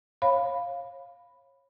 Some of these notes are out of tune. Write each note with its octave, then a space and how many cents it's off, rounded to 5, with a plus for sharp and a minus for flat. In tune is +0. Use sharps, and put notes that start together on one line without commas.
C#5 -25 F5 +0 B5 +0